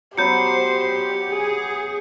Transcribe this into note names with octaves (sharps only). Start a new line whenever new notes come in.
F#3 B3 G4 C5 F#5 G6 C#7
G#4